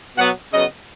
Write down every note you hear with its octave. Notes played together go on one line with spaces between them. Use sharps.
B2 F#3 B3 F#5
C#3 F#3 B3 D#5